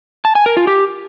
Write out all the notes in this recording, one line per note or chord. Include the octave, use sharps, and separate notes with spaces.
A5
G#5
A#4
F4
G4